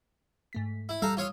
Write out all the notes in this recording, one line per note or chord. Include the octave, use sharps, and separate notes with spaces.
G#2 A3 B6
E4
G3 A4 F5 A#5 E6
F4 C#5 F5 D#6 E6